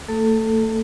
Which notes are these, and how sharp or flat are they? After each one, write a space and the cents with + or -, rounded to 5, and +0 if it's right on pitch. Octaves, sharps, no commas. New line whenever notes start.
A3 +35 A4 +0